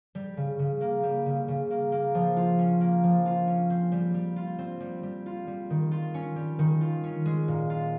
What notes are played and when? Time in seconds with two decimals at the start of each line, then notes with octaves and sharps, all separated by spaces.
0.15 G3
0.37 C#3
0.59 C#3
0.81 A#3
1.03 G3
1.26 C#3
1.48 C#3
1.71 A#3
1.92 A#3
2.15 F3
2.37 F4
2.59 C#4
2.81 A#3
3.03 F3
3.26 F4
3.47 C#4
3.70 C4
3.92 G3
4.14 G3
4.36 F4
4.59 C4
4.80 G3
5.03 G3
5.26 F4
5.47 G3
5.70 D#3
5.91 F4
6.14 C#4
6.36 G3
6.59 D#3
6.81 F4
7.04 C#4
7.26 G#3
7.48 A#2
7.70 F4